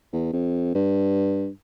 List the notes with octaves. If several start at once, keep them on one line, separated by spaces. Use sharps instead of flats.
E2
F2
G2